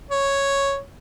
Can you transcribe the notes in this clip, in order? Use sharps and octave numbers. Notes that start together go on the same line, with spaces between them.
C#5